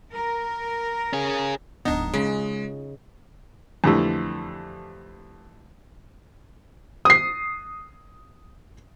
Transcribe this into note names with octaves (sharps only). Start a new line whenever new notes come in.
A#4
C#4 G#4
D1 G#1 B3 D4 D#4
C#3 G#3 F4
F2 D3 E3 G3 A3
D#6 C7